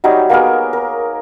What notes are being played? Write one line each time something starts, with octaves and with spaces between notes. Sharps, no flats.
F#3 G3 D#4 C#5
A#3 B3 G#4 A#4
A#4